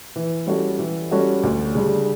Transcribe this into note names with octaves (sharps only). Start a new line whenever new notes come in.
E3
G3 C#4 F#4 A4
E3
G3 C#4 F#4 A4
D2
C#3 G3 D4